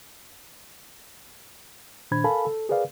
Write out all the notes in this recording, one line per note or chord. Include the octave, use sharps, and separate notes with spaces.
A#2 D#3 D4 C5 B5 G#6
A4 A#4 F5 G#5 A5 B5
A4
G#4 A#4 B4 D5 F5